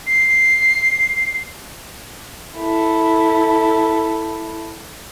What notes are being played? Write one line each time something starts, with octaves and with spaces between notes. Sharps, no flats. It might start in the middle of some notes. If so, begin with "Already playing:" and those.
C7
E4 A4